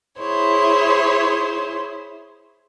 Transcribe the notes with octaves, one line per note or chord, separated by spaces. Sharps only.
E4 G#4 C5 C#5